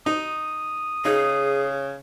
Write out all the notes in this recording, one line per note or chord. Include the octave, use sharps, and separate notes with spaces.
D#4 D#6
C#3 D#4 G#4